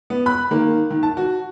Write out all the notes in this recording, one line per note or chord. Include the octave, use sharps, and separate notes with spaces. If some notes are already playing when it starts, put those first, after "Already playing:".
B3
B5 F#6
D#3 A#3
D#3
A5
F#4